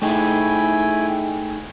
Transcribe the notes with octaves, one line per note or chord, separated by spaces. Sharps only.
A3 D#4 E4 G#4 G5 G#5